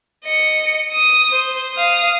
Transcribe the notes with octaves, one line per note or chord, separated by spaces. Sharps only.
D#5 C#7
D#6
C5
F5 D#6